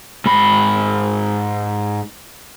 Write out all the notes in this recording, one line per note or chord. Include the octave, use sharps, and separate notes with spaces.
G#2 B5